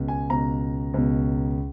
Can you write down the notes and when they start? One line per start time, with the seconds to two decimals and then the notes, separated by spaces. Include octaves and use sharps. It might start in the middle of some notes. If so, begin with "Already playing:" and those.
Already playing: C#2 B2
0.08 G#5
0.30 C#2 B2 A#5
0.94 C#2 B2